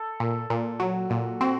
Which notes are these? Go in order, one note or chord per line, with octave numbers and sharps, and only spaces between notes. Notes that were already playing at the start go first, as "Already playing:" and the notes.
Already playing: A4
A#2
A#2
F#3 F#4
A#2
C4 F#4